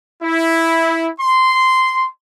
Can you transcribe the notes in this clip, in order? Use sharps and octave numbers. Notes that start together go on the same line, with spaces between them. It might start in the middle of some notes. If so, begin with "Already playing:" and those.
E4
C6